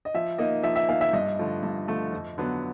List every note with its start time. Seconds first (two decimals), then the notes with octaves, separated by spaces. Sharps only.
0.05 D#5
0.14 F3 E5
0.38 A#3 D#4 D#5
0.63 F3 E5
0.76 E5
0.89 A#3 D#4 F5
1.01 E5
1.13 G2 D#5
1.39 D3 F3 A3
1.63 G2
1.88 D3 F3 A3
2.12 F2
2.38 D3 F#3 B3